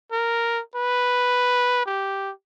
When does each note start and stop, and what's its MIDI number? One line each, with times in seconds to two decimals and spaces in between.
0.12 0.61 70
0.76 1.86 71
1.86 2.31 67